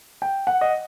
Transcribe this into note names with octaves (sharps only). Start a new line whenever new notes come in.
G5
F#5
D#5